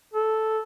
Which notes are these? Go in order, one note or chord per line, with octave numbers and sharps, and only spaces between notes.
A4